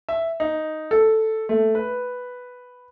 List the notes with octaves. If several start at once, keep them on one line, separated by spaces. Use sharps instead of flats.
E5
D#4
A4
A3
B4